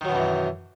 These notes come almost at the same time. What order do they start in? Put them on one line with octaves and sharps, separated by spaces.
D#3 F#3 B2 F#2 E3